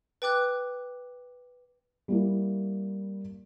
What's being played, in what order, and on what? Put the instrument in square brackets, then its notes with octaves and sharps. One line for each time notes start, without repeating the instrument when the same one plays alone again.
[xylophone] B4 G5 D6 F#6
[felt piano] G3 A#3 E4